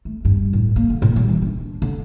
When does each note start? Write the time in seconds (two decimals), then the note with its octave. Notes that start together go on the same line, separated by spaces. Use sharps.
0.05 A3
0.25 G2
0.53 A2
0.76 A#3
0.90 D3
1.02 A#2
1.16 G3
1.29 E3
1.42 D4
1.82 D3